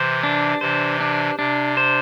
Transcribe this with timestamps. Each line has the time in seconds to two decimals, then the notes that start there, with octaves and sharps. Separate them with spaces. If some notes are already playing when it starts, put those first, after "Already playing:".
Already playing: C3 E3 C5
0.23 D4
0.61 C3 E3 C5
1.00 D4
1.38 C3 D4
1.77 C5